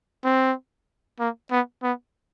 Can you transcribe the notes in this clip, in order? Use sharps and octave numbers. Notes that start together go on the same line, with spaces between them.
C4
A#3
B3
B3